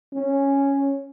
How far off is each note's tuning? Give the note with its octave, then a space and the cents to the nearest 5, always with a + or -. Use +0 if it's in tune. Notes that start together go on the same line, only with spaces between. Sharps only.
C#4 -5